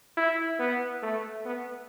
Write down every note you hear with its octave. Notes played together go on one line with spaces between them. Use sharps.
E4
B3
A3
B3